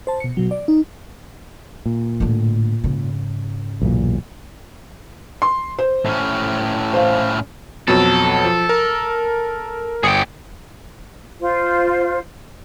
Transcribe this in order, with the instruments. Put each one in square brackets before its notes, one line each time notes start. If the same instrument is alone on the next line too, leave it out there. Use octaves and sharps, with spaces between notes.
[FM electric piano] C5 A5
B2 C#7
B2 F#3
D5
D#4
[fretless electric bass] A#2
[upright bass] A2 D3
G#2 C#3
[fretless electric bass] B1 E2 A#2
[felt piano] C6
C5
[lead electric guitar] A2 C#4
[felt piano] C5 F5
[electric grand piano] F2 B2 F#3 [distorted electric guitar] A4
[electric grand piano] F3
A#4
[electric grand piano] G1 D#6 C#7 [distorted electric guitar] G#4 G5
[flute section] F4 C5